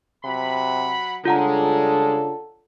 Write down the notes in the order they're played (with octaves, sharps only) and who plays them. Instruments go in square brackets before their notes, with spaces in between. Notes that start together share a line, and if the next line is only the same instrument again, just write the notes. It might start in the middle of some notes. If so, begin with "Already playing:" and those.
[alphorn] C3 [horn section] F#3 F#5 B5
[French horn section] C#3 D4 [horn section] G3 G#3 [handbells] F4 F#5 A#5 [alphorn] A4